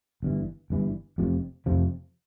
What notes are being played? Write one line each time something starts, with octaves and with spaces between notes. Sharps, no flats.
G1 G2 E3
G1 G2 E3
F1 F2 C3 F3
F1 F2 C3 F3